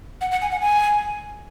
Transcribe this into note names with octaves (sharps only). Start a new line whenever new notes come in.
F#5
F#5
G#5
F#5
G#5